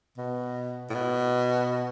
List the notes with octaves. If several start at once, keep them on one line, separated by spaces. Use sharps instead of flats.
B2
A2
B2